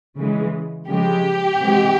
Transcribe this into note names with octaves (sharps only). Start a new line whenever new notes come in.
C#3 E3 G#3
C#3 F3 G#3 G4
C3 E3 G#3